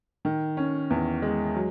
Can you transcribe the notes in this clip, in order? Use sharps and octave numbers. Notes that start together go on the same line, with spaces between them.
D#3
C#4
E2
G#3
F#3